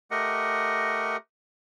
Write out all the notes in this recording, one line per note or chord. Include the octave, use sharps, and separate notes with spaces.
A3 G4 A#4 D#5 F#5